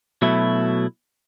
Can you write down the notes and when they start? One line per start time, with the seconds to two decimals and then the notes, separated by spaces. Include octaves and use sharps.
0.22 B2 F#3 A3 E4